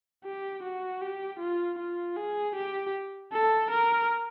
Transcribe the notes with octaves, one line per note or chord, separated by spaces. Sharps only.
G4
F#4
G4
F4
F4
G#4
G4
A4
A#4